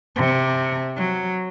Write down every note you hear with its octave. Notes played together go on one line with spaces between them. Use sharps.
C3
F#3